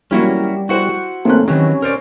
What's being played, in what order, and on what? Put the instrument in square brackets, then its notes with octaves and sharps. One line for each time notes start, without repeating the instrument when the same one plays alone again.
[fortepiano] E3 F#3 A#3 [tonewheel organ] G3 [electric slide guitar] C#4 E4 F#4
[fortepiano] E4 C5 [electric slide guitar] F#4 F#5
[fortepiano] G#1 C#4 F#6 [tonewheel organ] A3 A#3 C4
[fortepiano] C3 [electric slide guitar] D#3 E3 F#3 [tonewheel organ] C#4
[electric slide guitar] A#4 C5 D5